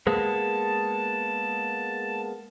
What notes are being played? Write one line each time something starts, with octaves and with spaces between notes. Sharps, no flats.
G#3 A#3 B3 A5